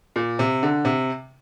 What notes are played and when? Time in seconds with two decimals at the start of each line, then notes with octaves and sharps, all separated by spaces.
0.16 A#2
0.39 C3
0.63 D3
0.85 C3